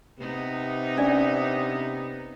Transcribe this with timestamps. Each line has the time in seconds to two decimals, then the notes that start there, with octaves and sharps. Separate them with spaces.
0.19 C3 B3 D#4
0.97 C#4 D4 D5